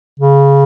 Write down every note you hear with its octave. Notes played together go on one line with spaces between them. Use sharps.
C#3